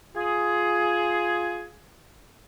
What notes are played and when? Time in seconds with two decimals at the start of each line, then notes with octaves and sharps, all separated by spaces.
0.15 F4 G#4